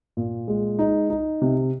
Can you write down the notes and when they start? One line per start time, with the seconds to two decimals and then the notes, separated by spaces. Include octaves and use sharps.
0.17 A#2
0.48 G#3
0.79 D#4
1.10 D#4
1.42 C3